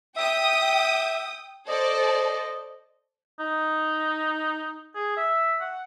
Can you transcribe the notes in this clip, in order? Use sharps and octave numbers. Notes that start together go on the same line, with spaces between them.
E5 G5 D#6
A4 C5 D5 D#5
D#4
G#4
E5
F#5